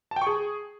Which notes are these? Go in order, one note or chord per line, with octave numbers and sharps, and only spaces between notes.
A5
G5
C#6
G#4